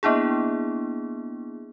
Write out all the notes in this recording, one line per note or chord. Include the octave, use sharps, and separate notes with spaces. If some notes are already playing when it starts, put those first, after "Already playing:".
A#3 B3 D4 E4 G#4